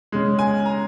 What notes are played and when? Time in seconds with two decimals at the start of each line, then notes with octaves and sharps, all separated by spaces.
0.12 C#3 G#3
0.39 G#5
0.65 A#5